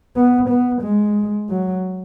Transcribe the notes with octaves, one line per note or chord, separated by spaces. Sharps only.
B3
B3
G#3
F#3